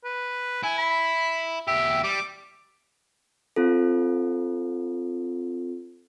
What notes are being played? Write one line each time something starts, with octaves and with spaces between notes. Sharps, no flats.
B4
E4 G#5
B5
E2 G4 E5
G3 D6
C4 F4 A4